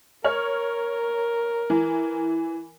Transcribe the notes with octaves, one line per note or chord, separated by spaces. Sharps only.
A#4 C#5 F6
E3